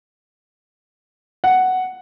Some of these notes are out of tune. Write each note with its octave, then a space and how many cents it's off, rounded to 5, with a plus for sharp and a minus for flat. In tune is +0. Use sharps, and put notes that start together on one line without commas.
F#5 +5